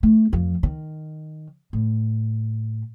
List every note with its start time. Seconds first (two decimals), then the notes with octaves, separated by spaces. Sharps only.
0.03 A3
0.32 F2 F3
0.63 D#3
1.73 A2